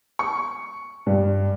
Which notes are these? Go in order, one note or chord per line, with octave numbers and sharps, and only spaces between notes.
C#6
G2